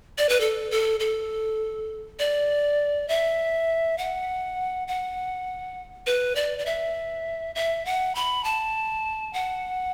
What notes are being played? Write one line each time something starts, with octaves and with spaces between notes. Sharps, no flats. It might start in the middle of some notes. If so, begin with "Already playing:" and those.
D5
B4
A4
A4
A4
D5
E5
F#5
F#5
B4
D5
D5
E5
E5
F#5
B5
A5
F#5